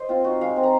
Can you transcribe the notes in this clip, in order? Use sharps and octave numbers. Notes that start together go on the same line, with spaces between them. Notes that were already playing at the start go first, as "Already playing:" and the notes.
Already playing: C5 D#5
C4 F4
D#4 F#4
G#3 F5
C4
A#5